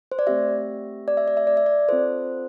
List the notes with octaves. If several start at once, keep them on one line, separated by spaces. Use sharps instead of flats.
C5
D5
A3 C4 G4 E5
D5
E5
D5
E5
D5
E5
D5
C4 F4 A4 C5